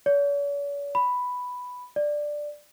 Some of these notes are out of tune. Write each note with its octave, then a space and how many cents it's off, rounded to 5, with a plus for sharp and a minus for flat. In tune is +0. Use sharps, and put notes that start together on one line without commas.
C#5 +45
B5 +5
D5 +5